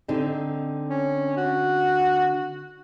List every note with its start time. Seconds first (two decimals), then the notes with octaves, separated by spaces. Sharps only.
0.08 D3 C4 D#4
0.89 C#4
1.37 F#4